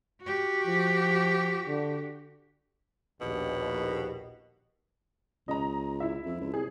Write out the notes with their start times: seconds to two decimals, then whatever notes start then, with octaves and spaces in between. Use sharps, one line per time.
0.22 F#4 G4
0.66 F3
1.67 D3
3.20 A#1 D#2 B2
5.48 C#2 D#5 A#5
6.00 E4 E5
6.26 F2
6.41 C#2
6.54 C2 G#4